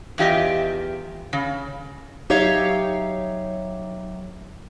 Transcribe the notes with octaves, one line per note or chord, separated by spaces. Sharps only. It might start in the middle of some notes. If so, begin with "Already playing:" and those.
E2 F4 G4 D#5 E5
C#3
F#3 D#4 G4 C#5 E5 F5